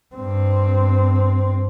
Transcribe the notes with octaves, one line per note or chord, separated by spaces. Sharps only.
G2 C4